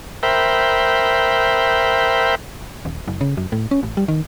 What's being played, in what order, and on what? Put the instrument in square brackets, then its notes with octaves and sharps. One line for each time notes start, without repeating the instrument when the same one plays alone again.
[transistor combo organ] A#4 C5 E5 G5 B5
[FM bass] D#1
F#1
C#3
F#2
A2
C#4
A1
G3
D#3